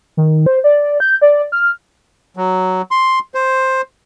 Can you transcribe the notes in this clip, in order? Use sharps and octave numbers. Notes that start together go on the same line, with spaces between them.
D#3
C5
D5
G6
D5
F6
F#3
C6
C5